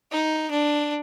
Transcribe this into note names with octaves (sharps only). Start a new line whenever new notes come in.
D#4
D4